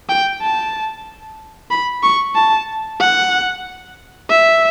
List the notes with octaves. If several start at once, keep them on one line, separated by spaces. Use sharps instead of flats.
G5
A5
B5
C#6
A5
F#5
E5